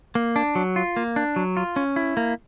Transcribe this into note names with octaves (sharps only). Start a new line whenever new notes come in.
A#3
D4
F#3
F4
A#3
D4
F#3
F4
C#4
E4
A#3